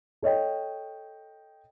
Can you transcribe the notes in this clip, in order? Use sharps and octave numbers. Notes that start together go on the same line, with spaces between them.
A4 C#5 D#5 G5